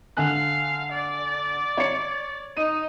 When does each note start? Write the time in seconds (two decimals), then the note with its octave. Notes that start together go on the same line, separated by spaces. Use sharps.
0.17 D3 F5 G#5 F#6
0.91 D5
1.78 C#5 C#7
2.57 D#4 D#7